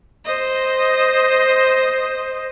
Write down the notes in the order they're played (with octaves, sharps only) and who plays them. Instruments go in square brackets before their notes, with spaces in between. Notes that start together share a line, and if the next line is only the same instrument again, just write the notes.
[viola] C5 D#5